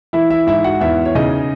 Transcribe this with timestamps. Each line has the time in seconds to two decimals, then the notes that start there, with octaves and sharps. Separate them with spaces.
0.13 E3 E4 E5
0.30 E4 E5
0.47 G#2 E4 E5
0.64 F#4 F#5
0.81 E2 E4 E5
1.05 C#5
1.15 C#3 D#4 D#5